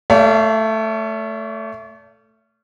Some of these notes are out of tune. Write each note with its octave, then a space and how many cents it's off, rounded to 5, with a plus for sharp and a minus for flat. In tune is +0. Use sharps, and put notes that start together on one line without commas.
A3 +5 D5 -45 F5 -25